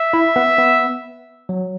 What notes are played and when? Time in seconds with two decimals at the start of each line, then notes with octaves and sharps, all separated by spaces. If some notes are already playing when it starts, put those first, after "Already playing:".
Already playing: E5
0.13 E4
0.36 B3
0.58 B3
1.49 F#3